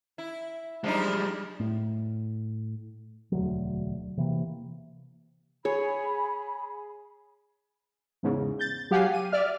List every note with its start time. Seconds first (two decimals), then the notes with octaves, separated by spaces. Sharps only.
0.18 E4
0.84 F3 G3 G#3 D4 D#4
1.60 A2
3.32 E1 D2 F#3
4.17 C3 E3 A#3
5.65 G#4 C#5 B5
8.23 E2 G#2 C#3
8.59 G6 A6
8.91 F#3 G4 F5 F#5 G#5 C7
9.14 D#7
9.32 D5 E5 F6